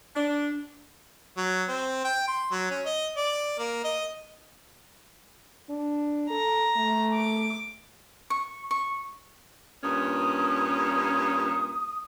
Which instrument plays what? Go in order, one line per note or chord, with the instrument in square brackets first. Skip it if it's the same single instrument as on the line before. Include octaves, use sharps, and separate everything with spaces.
[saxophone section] D4
[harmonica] F#3
C4
G5
C6
F#3
C#4
D#5
D5
A#3
D#5
[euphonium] D4
[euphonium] A4 [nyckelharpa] A#5
[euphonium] A3
[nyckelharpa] D6
[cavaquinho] C#6
C#6
[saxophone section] G2 A#2 C#4 [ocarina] D#6